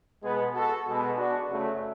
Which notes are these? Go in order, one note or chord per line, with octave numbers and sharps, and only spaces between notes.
B2 G#3 B3 G#4 B4
F#4 A4
B2 G#3 B3
D4 F#4
F#2 C#3 F#3 A3